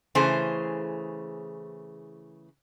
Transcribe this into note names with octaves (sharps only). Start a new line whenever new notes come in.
C#3 E3 A3 G#4 C5